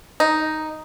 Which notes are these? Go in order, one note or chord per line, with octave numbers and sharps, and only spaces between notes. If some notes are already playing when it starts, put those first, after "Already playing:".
D#4